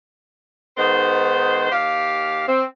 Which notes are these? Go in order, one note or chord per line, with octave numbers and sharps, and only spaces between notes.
G#2 D#3 B3 C5
D#2 G4 F5
C4